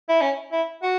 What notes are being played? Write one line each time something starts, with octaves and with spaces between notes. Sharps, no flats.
E4
C#4
E4
F#4